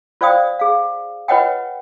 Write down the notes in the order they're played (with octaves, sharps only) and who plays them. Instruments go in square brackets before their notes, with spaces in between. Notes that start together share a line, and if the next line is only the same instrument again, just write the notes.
[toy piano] F4 C5 D5 F5 G5 D#6
G#4 F5
F4 B4 C#5 D#5 F#5 G5